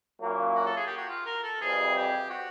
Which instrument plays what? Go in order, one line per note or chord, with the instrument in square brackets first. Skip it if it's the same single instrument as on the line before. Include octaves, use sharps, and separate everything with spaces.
[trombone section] A#2 F#3 A#3 C#4 E4
[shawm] F#4
A4
G#4
G4
F#4
F4
A#4
A4
[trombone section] F2 C3 E3 G3 C4 [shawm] G#4
[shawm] G4
F#4